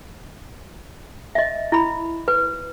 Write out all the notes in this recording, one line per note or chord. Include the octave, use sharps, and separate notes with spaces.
D#5 E5
E4 B5
B4